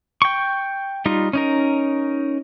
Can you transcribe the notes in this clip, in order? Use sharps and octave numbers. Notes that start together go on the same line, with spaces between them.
G5 C#6
G3 D#4 F4
C#4 D#4 A#4